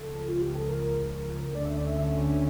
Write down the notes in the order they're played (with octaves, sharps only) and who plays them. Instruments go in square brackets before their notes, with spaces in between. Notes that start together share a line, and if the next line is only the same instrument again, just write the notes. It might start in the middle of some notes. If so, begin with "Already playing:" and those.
Already playing: [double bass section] C#2 C#3 F3 [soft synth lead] A4
[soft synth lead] F4
G4
A4
A#4
[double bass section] D2 D3 A3 C#4 [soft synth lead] D5
[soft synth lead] E5
D5
E5
E5